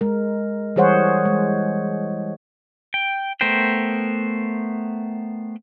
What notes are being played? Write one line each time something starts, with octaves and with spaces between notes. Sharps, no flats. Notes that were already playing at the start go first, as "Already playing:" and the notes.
G#3 A#4
E3 G3 G#4 C5 C#5 F#5
G#3
G5
A3 B3 A#4 C5 G5